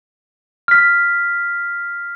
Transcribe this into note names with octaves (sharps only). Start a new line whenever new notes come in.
F6 B6